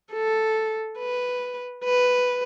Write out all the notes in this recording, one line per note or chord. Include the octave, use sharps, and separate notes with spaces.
A4
B4
B4